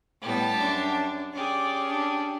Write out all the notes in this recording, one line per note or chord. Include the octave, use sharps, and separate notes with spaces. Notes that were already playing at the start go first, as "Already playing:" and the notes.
A2 G3 B3 G4 A5
F#2 D4
C#4 G4 G#4 D5
D4